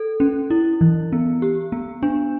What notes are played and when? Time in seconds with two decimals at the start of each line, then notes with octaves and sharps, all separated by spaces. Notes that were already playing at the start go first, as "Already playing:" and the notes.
Already playing: A4
0.20 C#4
0.50 E4
0.81 E3
1.12 B3
1.42 G4
1.72 B3
2.03 D4